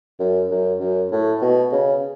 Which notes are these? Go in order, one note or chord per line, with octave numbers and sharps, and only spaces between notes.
F#2
F#2
F#2
A2
B2
C#3